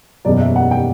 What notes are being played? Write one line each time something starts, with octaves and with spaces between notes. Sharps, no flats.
F#1 E2 B2 F#3 D5
E5
F#5
G5